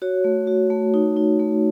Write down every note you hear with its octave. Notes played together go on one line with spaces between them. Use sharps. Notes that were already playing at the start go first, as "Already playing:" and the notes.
F#4 C#5
A3
F#4
A3
D#4
D#4
A3